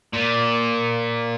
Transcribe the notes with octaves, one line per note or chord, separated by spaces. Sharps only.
A#2